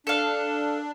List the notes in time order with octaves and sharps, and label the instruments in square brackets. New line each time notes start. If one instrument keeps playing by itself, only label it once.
[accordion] D4 [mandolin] A4 F5